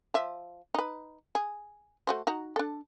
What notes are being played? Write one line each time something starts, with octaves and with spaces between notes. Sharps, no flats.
F3 E5
D#4 B4
G#4
A3 F#4 C5
D#4 F#4 A#5
D4 A4